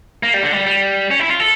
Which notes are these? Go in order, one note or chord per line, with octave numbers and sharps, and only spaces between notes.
A#3
G3
D3
G3
G3
C#4
E4
F4
A4